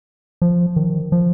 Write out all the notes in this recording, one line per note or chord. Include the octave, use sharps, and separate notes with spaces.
F3
D#3
F3